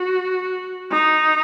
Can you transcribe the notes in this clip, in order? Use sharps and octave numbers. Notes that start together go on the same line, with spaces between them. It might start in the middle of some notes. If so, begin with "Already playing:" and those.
Already playing: F#4
D#4